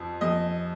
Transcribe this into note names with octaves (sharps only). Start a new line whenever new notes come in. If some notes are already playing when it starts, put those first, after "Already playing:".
Already playing: F2 F3
F2 D#5